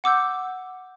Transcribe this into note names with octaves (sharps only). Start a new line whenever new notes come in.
F#5 D6 E6 G6